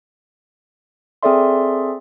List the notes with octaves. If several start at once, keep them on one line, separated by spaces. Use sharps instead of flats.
C4 G#4 A4 D5 E5 C6